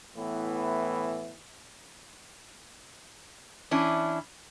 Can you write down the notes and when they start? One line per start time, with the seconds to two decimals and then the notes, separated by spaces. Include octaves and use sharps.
0.16 A2 E3 B3 E4
3.71 E3 C#4 D4 E4